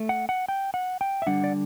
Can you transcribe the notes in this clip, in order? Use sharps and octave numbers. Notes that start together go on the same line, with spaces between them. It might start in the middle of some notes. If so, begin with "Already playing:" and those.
Already playing: A3
F#5
F#5
G5
F#5
G5
E5
D3 G3 D4 F#5
D5